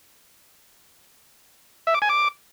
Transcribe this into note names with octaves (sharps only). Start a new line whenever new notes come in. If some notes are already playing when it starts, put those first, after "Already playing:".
E5
D6
G#5
D6